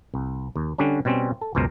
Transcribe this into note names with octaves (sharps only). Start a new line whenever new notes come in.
C2
D#2
D3 G3 C#4 D4
B2 G3 C4 C#4
A4
C#2 F#2 B2 A#4 C5